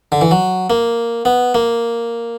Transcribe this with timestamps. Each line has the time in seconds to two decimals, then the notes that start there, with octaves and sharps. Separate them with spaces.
0.12 D3
0.21 E3
0.31 F#3
0.70 A#3
1.25 B3
1.54 A#3